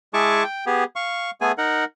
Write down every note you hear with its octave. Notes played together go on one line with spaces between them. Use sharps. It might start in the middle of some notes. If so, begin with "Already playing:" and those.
G#3 E4 G#4 A5 C#6 D6
G5
B3 G4 G#4
F5 C#6
A3 B3 G#4 G#5
D#4 A#4 F#5